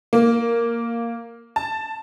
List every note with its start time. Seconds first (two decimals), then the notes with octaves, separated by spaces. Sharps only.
0.13 A#3
1.56 A5